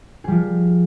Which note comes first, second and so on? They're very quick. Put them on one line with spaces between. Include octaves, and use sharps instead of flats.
G#4 G3 F3